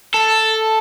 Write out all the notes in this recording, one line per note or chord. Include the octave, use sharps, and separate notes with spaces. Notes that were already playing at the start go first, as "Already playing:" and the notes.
A4